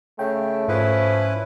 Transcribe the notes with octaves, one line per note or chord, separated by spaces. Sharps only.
C#3 A3 G5
G#2 F3 C#4 E4 B4 E5